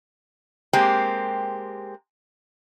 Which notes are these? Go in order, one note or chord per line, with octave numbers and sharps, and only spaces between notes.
G#3 A#3 C4 G4